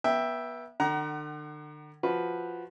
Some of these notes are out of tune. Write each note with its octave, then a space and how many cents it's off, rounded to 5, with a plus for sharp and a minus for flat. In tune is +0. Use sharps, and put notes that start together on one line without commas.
B3 -30 E5 +0 G5 +5
D3 +40 F#5 +40 A#5 +20
F3 +0 F#4 +0 B4 +0